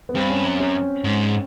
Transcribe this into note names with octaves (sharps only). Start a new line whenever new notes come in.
B3
G2 C4
C#4
F#2
C#4
G#2